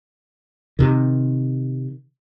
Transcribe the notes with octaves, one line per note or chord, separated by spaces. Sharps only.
C3 D#3